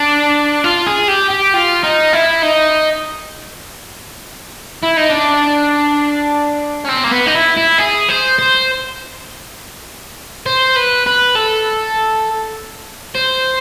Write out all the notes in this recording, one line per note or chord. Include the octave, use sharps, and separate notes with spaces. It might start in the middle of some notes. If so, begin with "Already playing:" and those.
Already playing: D4
F4
G#4
G4
G4
F4
D#4
E4
D#4
E4
D#4
D4
C#4
C4
A#3
B3
D#4
E4
E4
G#4
C5
C5
C5
B4
B4
A4
C5